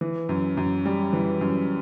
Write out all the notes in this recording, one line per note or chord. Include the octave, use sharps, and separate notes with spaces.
E3
F#2
F#2
G3
E3
F#2